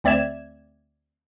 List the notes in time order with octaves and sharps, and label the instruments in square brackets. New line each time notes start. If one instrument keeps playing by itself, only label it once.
[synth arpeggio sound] D2 C4 D5 E5 G#6 E7